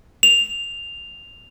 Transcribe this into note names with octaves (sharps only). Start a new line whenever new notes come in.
F7